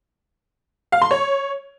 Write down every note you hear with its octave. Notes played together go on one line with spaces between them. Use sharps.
F5
C6
C#5